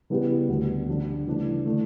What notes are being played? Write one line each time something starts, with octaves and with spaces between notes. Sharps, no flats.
C#3 G3 B3 E4 G4
D2 D3 F#3 B3
D2 D3 G3 D4
C#3 E3 A3 D4
D3 A3 E4